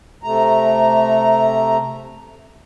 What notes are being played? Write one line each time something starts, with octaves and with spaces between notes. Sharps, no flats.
C3 A3 A#5